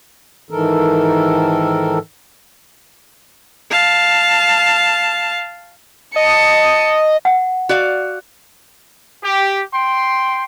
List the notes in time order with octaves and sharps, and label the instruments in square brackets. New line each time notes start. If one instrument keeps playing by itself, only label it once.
[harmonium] G#2 D#3 E3 A4 A#4
[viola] F5 A5
[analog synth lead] D#5 [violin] A5 C#7
[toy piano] F#5
[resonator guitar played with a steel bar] F#4 D5 F5
[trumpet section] G4
G5 C6